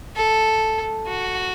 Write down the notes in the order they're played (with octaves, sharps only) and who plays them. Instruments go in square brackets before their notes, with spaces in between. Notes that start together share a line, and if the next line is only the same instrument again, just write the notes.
[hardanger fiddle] A4
F#4